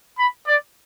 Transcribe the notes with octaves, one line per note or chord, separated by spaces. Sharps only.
B5
D5